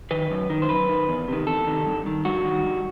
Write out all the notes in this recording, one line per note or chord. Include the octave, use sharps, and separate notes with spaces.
D#3 B4
F#2
D#3
C5
F#2 B4
D#3
E2
C3 D#3
E2 A4
C3 D#3
G2
D#3
G2 F#4
D#3
G2